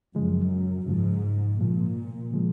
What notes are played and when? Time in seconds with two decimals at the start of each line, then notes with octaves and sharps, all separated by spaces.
0.15 F#2 C#3 F3 G#3
0.87 G#2 C#3 F3 G#3
1.59 A#2 C#3 F3 G#3
2.31 C#3 F3 G#3